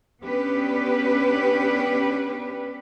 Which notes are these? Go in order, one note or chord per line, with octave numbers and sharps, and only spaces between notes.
B3 C#4 D4 G4 B4